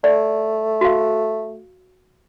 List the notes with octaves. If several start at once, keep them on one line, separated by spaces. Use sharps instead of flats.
A3 D5
F#4 F5